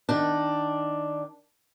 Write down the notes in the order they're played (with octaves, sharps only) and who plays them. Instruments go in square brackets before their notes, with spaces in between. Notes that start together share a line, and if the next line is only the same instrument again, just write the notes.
[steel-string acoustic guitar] D#3 D4